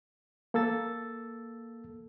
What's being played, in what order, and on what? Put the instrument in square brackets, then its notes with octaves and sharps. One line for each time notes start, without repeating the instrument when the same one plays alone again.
[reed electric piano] A#3 A4 E6 A6